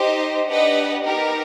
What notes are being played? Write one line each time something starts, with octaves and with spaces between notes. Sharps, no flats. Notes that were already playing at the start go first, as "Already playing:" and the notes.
Already playing: D#4 G4 C5 D#5
D4 G4 B4 D#5 F#5
B3 D#4 G4 A#4